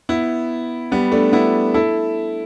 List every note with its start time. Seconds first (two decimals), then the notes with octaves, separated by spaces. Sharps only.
0.09 B3 E4
0.92 G3 B3
1.12 A3 D4
1.33 B3 E4
1.74 E4 A4